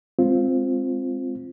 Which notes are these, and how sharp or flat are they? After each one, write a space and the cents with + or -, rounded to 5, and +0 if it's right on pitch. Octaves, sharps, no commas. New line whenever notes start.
G#3 +0 C4 +0 F4 +0